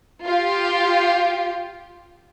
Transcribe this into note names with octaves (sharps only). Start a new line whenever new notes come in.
F4 G4